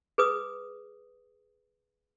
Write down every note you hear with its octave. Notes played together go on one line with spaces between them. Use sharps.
G#4 B4 D#6